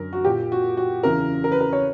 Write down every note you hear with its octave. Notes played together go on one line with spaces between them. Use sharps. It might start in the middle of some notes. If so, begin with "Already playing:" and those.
Already playing: F#2 D3 A#4
F#4
A#2 G4
F#4
F#4
E2 C#3 E3 A#4
A#4
B4
A#4
C#5